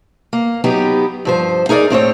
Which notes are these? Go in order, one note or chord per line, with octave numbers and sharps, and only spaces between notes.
A#3
F#3 B3 D#4 G4
G2 F3 C5
D#4 G#4 A#4 C#5 D5
A2 C4 C5 C#5